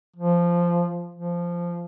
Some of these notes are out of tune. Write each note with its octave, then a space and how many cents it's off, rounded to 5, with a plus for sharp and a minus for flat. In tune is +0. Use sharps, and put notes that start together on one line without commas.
F3 -10
F3 -10